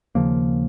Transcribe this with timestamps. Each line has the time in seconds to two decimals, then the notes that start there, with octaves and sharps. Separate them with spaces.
0.15 D#2 C#3 F3 A#3